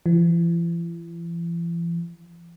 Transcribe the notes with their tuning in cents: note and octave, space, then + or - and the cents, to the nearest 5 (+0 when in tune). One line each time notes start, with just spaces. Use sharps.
E3 +45